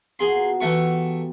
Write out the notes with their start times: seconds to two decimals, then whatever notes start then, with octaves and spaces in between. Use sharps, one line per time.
0.19 F4 F#4 G#4 A#4 C6
0.31 B2 A5
0.60 E3 A3 B3 G4 G#4 C#6